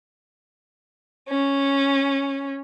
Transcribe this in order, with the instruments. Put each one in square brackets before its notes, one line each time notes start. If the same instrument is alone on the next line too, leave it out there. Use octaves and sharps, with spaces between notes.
[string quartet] C#4